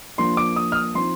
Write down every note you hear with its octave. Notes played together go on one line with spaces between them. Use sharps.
F3 A#3 D4 C6
D6
D#6
F6
D#6
F3 C4 D#4 C6